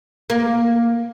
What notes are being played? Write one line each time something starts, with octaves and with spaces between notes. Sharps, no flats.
A#3